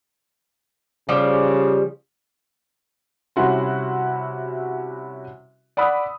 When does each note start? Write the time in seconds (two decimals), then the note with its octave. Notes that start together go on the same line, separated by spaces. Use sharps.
1.09 C#3 F3 G3
3.36 C3 G3 C#4 E4 F#4 C6
5.77 D5 F#5 B5 D#6 E6